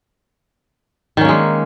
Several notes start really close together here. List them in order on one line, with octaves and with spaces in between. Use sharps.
D#3 C#4 A#3 G#3